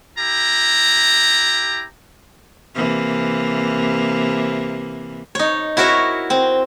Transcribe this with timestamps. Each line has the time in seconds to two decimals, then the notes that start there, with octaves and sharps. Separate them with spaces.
0.19 E4 G4 A#5
2.75 C3 E3 A#3
5.35 D#4 C#5
5.77 E4 F#4 A#4 C#5 E5
6.30 C4